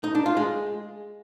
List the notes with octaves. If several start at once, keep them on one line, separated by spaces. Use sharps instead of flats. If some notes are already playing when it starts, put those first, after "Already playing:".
D#4
D4
F4
G#3